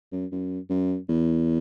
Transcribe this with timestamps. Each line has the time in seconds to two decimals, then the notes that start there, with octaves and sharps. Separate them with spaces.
0.12 F#2
0.32 F#2
0.70 F#2
1.09 E2